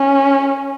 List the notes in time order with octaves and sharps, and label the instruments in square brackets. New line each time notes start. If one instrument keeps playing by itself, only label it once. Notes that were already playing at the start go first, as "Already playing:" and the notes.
Already playing: [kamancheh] C#4